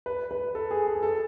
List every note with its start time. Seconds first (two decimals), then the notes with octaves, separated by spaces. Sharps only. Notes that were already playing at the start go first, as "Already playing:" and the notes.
0.06 B4
0.31 B4
0.55 A4
0.71 G#4
0.87 G#4
1.03 A4